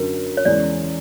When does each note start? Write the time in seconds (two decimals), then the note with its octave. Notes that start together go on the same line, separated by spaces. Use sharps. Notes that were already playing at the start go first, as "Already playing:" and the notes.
Already playing: F#2 D3 F#3 A#4
0.37 C#5
0.45 E2 C#3 E3 G#3 C#4 D5